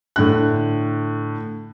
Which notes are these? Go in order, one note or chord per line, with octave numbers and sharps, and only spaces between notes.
A2 D3 F#6